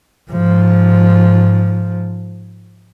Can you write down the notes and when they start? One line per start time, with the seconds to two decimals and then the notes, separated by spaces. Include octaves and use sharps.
0.31 G#2 F3